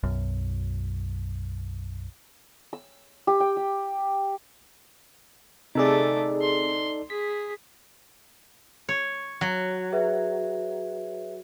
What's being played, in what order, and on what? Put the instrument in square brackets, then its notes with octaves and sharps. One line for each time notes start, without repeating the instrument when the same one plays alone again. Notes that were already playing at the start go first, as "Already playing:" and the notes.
[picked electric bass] B1 F#2
[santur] E6
G4
G5
G4
[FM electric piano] C3 G#4 [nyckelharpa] A3 D6 [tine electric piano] D#4 A4 D5
[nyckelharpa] C6
[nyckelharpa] G#4 [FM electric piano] B6
[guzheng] C#5
F#3
[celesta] G#4 B4 E5